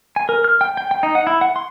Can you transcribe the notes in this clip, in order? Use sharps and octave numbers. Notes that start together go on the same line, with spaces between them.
G#5
A#4
F6
G5
G5
G5
D#4
F#5
E4
F#5
C6